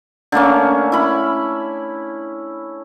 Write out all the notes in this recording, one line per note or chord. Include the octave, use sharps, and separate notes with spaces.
D3 A3 A#3 C#4
E4 B5